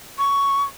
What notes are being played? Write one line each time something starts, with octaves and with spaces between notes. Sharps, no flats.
C#6